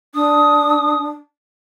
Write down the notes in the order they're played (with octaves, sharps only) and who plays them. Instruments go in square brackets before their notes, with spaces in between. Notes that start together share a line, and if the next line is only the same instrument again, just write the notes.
[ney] D4 [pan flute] D#6